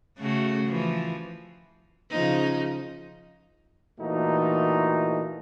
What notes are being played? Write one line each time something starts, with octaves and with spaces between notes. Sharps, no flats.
C#3 A3 F#4
E3 F3
C#3 F3 D#4
A#2 E3 A3 D#4 F#4